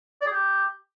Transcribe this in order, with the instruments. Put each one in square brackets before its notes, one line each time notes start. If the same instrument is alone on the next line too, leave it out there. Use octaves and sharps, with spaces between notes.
[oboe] D5
G#4
G4